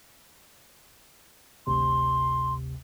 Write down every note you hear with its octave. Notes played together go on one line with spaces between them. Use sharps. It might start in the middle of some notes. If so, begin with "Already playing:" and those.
G#1 D2 C3 C6